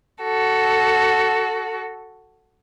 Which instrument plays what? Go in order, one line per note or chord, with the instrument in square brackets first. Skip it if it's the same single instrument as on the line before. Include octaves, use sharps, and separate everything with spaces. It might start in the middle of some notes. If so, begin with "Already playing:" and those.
[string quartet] F#4 A4